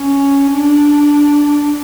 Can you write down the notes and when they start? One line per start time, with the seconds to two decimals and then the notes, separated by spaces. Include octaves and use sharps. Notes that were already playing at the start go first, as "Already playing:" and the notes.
Already playing: C#4
0.52 D4